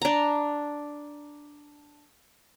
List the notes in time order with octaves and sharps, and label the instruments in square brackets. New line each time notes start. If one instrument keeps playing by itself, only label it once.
[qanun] D4 A#5